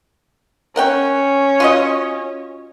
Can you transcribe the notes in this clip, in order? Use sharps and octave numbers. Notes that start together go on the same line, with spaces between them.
C#4 A#4 F#5 G5
F4 F#4 D#5